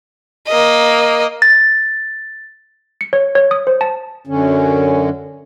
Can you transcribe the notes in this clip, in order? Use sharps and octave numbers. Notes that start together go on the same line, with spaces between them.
A#3 D#5
A6
C#7
C#5
C#5
D#6
C5
A5
F#2 D3 C#4